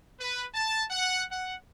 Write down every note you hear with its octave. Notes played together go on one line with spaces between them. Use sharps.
B4
A5
F#5
F#5